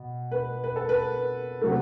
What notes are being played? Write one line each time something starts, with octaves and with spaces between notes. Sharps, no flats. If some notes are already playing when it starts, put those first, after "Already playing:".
Already playing: B2
B4
B4
A4
B4
C3 F#3 A3